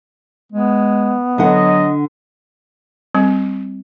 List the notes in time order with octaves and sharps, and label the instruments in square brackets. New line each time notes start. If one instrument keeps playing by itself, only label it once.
[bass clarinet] G#3 [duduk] B3
[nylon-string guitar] D3 F#5 [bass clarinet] F#3 [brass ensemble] D#5
[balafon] G3 C4